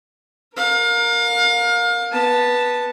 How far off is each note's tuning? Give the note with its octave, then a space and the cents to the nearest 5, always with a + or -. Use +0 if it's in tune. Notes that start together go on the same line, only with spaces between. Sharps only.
A#4 +0 F5 +30
B3 -15 A5 +0